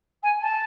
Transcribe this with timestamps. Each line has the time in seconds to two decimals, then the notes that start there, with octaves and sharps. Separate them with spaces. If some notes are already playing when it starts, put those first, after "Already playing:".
0.23 G#5
0.41 A5